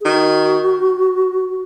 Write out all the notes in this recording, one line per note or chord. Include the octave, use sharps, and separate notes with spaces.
G#4
D#3 F#4